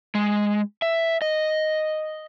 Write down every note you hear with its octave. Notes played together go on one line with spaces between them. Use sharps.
G#3
E5
D#5